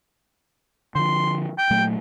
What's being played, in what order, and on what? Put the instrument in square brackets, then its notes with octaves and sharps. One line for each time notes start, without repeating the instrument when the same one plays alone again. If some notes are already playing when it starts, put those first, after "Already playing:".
[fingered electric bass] D3 F3 [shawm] C6
[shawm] G5
[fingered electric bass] A#2 F#3 A3